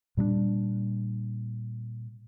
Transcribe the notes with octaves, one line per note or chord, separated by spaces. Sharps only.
A#2 G3 G#3 D4